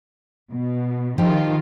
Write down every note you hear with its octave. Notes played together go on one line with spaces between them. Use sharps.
B2
D#3 F3 D#4 F4 G4